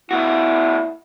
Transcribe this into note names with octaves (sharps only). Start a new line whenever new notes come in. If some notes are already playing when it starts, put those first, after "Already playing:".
A#2 E4 F#4